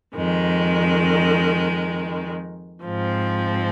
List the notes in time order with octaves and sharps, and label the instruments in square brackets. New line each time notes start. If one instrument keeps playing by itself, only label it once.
[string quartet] F2 D#3 G#3
G#2 F3 C4